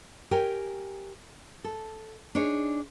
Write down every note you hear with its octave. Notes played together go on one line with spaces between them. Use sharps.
G4 A#4 C#5 G5 G#5
A4
D4 D#4 G#4 C#5